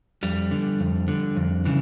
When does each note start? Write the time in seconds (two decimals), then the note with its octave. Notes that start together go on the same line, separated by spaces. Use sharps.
0.23 F2 G3
0.51 D3
0.80 F2
1.08 D3
1.36 F2
1.65 C#3 E3